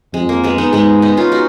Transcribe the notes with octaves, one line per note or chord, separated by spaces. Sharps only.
F2 G#3
A#3
G#3 B3
B3 D#4
G#2 G#3 B3
B3 D#4
C#4 F4
D#4 F#4